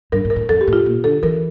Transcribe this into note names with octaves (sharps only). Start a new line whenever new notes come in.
G2 A#4
A2
A#4
A2
F2 A4
G4
A2
F4
A#2
D3 A4
E3 A#4